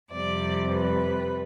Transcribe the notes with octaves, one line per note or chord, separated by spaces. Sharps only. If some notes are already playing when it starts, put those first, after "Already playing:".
F2 C3 G3 D5
B4